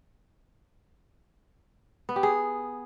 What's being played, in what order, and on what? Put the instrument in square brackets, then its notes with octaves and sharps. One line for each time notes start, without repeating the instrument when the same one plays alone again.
[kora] B3
G4
G#4